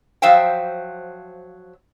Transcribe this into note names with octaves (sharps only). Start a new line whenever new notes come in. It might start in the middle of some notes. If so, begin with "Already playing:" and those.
F3 F#3 C5 E5 F5 G5